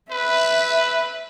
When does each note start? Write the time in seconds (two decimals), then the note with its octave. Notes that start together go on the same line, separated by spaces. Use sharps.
0.11 B4 E5